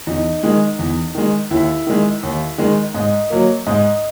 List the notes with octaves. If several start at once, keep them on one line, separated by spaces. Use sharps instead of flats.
E2 D#4
D#3 G#3
E2
D#3 G#3
D#2 E4
D#3 G#3
D#2
D#3 G#3
G#2 D#5
F#3 A#3
G#2 D#5